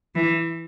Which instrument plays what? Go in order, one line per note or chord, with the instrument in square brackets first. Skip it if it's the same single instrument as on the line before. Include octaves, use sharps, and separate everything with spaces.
[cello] E3